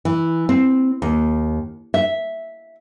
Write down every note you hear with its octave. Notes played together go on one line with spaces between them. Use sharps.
E3
C4
D#2
E5